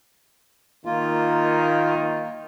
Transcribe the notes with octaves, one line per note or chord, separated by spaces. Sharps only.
D#3 A#3 F4